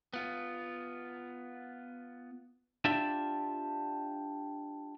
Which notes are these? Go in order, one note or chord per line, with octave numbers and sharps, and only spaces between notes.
B3 F4
D4 F4 G4 D5 E5